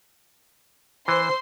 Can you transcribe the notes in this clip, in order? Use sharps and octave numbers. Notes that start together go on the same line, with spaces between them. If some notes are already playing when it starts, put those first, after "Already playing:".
E3 C5 C6